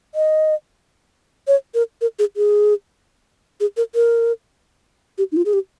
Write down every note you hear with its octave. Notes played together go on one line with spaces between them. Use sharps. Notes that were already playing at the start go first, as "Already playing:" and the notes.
D#5
C#5
A#4
A#4
G#4
G#4
G#4
A#4
A#4
G4
D#4
F4
G#4
G4